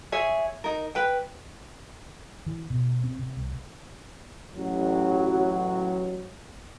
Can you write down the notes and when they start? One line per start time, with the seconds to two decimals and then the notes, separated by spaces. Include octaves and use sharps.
0.12 G#4 C#5 E5
0.64 D#4 A#4
0.95 B4 G5
2.46 E3
2.70 B2
3.04 C4
3.19 C3
3.37 C2
4.57 A1 F#3